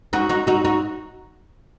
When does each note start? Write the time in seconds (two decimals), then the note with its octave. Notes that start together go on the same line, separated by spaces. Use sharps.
0.13 D#4 F#4
0.29 D#4 F#4
0.47 D#4 F#4
0.65 D#4 F#4